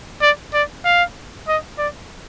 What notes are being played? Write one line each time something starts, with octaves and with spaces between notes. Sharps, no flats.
D5
D5
F5
D#5
D5